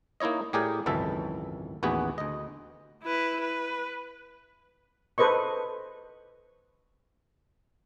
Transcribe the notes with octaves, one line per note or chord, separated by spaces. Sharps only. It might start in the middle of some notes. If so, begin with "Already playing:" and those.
A#3 D#4 E4 C#5 D#5
A2 G4 G#4 A#4 D5 G#5
G#1 C#2 F#2 E3 A4 E5
A1 D#2 B3 F#4 G#4 B4
D2 D#5
E4 B4
B4
A4 B4 C5 D#5 C#6